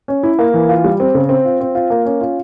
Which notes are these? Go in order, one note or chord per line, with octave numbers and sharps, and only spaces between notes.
C#4
E4
A#3
E3
F4
G3
C4
C#3
C4
F4
C4
F4
A#3
C#4
F4